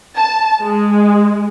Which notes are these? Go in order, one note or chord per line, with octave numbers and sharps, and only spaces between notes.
A5
G#3